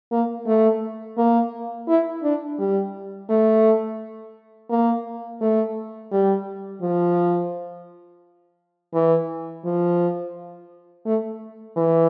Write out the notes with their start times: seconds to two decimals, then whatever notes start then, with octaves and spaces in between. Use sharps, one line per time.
0.12 A#3
0.47 A3
1.18 A#3
1.88 E4
2.23 D4
2.59 G3
3.30 A3
4.70 A#3
5.41 A3
6.12 G3
6.82 F3
8.94 E3
9.65 F3
11.06 A3
11.77 E3